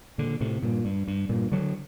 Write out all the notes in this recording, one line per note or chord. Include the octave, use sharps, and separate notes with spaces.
A#2 D3
A2 C3
G2 A#2
G2
G2
G2 A#2
D3 F#3